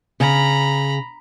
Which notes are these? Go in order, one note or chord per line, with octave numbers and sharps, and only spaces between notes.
C#3 A#5 B5